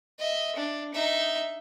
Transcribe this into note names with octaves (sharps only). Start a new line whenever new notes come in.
D#5 E5
D4
D#4 E5